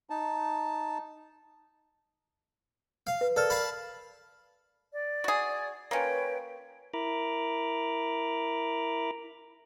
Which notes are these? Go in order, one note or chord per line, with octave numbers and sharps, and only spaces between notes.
D#4 A5
F5
B4
A4 A#4 D5 F6
F5 A5 B5
D5
F#4 G#4
A#3 C#4 F4 B4 C#5 G5
E4 A#4 A#5 B5 D6